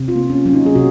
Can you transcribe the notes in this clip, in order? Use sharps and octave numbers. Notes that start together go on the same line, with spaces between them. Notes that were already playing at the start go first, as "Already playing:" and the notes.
Already playing: C3
F4
A#3
C#4
F#3 C#4
D#4
G#4
C3 F#4